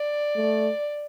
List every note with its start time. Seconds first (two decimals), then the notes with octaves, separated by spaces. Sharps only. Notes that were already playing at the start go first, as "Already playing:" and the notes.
Already playing: D5
0.35 A3